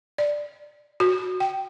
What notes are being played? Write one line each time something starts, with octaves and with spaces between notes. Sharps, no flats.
D5
F#4
G5